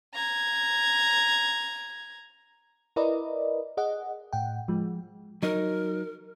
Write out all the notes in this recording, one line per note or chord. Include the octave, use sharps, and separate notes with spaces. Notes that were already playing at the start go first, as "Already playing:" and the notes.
A#5 G#6
E4 A#4 B4 D5 D#5
G#4 D#5 F#5
A2 F#5 G5
F3 G#3
F#3 D#4 A#4